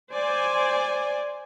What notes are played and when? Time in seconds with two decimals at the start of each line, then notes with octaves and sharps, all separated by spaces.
0.13 C5 D5 G#5